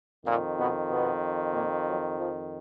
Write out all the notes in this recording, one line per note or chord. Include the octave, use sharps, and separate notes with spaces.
F2 A#2 D#3 A#3
B2 B3
B2 B3
A#2 A#3
F#3
F3